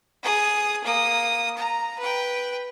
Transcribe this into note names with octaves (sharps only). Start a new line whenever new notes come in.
G#4 D#6
A#3 D#6
A#5
B4 G5